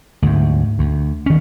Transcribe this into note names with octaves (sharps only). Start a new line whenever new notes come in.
D2 G#2
D2
D#3 C#4